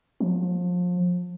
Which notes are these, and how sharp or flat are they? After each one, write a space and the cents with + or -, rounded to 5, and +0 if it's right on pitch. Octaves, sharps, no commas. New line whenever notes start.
F3 +30